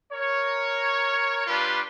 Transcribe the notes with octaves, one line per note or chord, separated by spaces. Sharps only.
A#4 C#5
G3 D4 F4 G4 B4